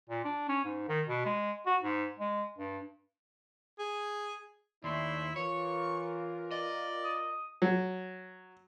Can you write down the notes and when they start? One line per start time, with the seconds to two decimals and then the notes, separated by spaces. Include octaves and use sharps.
0.09 A#2
0.25 D4
0.49 C#4
0.64 G#2
0.89 D#3
1.07 B2
1.26 G#3
1.66 F#4
1.82 G#2
2.19 G#3
2.58 G2
3.79 G#4
4.84 D#2 A3 E4 D5 C6
5.36 E3 F4 A#4 C#5 C#6
6.51 D5 D#5
7.04 D#6
7.62 F#3